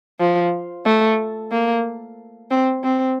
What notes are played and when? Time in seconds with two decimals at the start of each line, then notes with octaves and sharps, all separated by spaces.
0.20 F3
0.86 A3
1.52 A#3
2.51 C4
2.84 C4